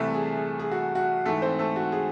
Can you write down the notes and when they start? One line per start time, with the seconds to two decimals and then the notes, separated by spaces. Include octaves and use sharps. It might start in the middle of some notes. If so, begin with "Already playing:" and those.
Already playing: C2 C3 E3 A3 A4
0.14 G#4
0.37 G#4
0.59 G#4
0.71 F#4
0.95 F#4
1.25 G#2 E3 A3 A4
1.42 C4 C5
1.59 A3 A4
1.76 F#4
1.92 G#4